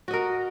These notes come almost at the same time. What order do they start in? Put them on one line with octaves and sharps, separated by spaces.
F#4 D#5 A#4